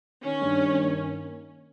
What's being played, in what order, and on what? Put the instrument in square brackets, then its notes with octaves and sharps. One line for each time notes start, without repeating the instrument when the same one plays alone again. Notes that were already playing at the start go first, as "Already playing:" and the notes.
[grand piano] D#3 [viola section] C#4
[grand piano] G2
D#3
A#3